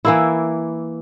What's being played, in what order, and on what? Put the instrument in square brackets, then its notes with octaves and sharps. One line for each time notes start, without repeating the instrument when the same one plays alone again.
[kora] E3 A#3 E4